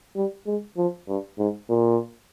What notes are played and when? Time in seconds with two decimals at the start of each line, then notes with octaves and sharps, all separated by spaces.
0.16 G3
0.46 G#3
0.77 F3
1.08 G2
1.38 G#2
1.69 A#2